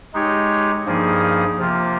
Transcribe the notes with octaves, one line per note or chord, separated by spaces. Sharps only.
G#3 D#4 G4 C#5
G2 F3 A#3 D#4 G#4
C3 F3 A#3 F4